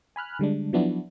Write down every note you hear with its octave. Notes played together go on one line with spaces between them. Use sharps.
G#5 B5 F6 F#6
D3 G3 G#3 D4
F3 F#3 B3 D4 E4 F#4